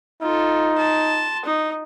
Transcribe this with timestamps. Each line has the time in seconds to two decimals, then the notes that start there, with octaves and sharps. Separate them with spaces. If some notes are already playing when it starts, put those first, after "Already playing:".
0.22 D#4 F4 A4
0.76 A5 C6
1.45 D#4